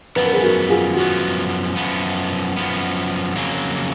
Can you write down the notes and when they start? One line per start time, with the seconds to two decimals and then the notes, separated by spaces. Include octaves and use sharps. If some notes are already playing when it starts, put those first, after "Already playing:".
0.16 F#2 F3 B3 B4
0.25 A#4
0.32 G#4 B4
0.43 F#4 A#4
0.69 F4 G#4
0.96 F#2 F3 B3 F#4
1.76 F#2 F3 B3
2.56 F#2 F3 B3
3.36 F2 C#3 F#3 A#3